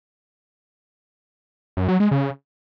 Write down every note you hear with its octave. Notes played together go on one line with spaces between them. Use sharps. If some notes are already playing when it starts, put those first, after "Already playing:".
F#2
F#3
G#3
C#3